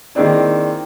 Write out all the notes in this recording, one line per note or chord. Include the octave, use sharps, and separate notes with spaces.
D#3 G#3 A#3 C4 D4 E4